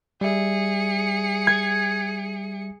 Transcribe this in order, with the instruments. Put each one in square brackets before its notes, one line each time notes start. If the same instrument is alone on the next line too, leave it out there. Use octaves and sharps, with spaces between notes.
[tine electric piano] G3 E5 [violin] G#4 C#7
[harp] G#6